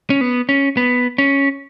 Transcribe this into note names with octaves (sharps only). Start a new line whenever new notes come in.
C#4
B3
C#4
B3
C#4